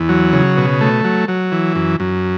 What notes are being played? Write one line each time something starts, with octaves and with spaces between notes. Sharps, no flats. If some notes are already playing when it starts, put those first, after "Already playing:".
Already playing: E2
F#3
C#3
B2
A3
F#3
F#3
E3
F#2
F#2